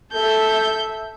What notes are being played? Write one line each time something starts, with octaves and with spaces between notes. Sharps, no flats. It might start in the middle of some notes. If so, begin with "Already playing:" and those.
A4 E5 G6